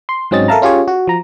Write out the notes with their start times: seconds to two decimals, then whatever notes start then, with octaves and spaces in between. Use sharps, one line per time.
0.09 C6
0.31 G#2 F#3 C4 C#4 D#5 A6
0.48 A4 A#4 E5 F5 A5 A#5
0.62 C#4 F4 G4 G#4 C#5
0.88 F#4
1.07 F3 A#5